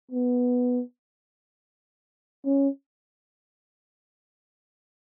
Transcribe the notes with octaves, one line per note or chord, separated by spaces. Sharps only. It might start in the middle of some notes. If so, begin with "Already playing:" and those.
B3
C#4